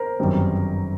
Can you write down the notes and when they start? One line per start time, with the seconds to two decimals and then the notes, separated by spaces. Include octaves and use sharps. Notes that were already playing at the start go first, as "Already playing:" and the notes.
Already playing: A#4 C5
0.19 G1 F#2 D#3 G3 C4